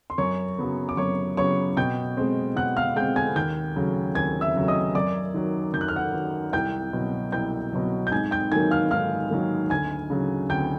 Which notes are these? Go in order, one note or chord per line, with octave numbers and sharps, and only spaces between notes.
C6
F#2 C#5 C#6
C#3 F#3 B3
D6
F#2 C#5 C#6
C#3 F#3 B3 C#5 C#6
B2 G5 G6
G#3 C4
B2 F#5 F#6
F5 F6
G#3 C4 G5 G6
G#5 G#6
D#2 G5 G6
C#3 F#3 A3
D#2 G#5 G#6
E5 E6
C#3 F#3 A3
D#5 D#6
F#2 D5 D6
D#3 F#3
F#2 G6
F#6
F6
F#5 F#6
D#3 F#3
C2 G5 G6
B2 F#3
C2 G5 G6
B2 F#3
G6
G#2 G#5 G#6
G5 G6
D#3 F#3 A#3 G#5 G#6
F5 F6
G#2 F5 F6
D#3 F#3 A#3
D2 G#5 G#6
C#3 F#3
D2 G5 G6